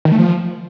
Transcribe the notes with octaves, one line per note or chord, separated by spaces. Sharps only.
D#3
A3
F3